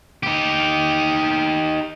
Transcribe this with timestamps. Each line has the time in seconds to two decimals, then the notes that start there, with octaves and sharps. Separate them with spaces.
0.23 D#4 G4